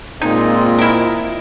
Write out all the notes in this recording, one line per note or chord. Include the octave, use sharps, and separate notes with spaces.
A#2 G#3 C4 D#4 F4 D#5
E4 A#4